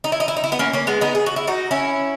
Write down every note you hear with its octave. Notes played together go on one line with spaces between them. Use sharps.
D#4
E4
D#4
E4
D#4
E4
B3 D#4
A#3 C#4
A#3 C#4
G#3 B3
B3 D#4
G#4
F#4
E4
D#4 F#4
C#4 E4